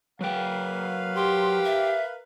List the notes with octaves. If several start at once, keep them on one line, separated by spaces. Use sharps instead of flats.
F#3 A#4 B4 F5 G5
G4 C6
E5